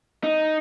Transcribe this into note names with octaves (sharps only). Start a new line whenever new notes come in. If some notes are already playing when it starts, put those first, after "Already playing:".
D#4